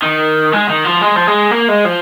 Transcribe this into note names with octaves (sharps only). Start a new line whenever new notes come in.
D#3
G#3
D#3
F3
G#3
F3
G#3
A#3
G#3
F3